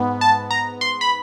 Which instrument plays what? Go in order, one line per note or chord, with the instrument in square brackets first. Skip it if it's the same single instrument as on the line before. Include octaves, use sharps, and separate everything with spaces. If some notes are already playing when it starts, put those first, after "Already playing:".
Already playing: [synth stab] G#2 B3
A5
A#5
C6
B5